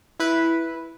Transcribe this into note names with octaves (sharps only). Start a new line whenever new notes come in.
E4 B4